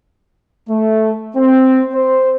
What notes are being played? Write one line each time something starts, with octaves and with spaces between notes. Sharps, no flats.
A3
C4
C5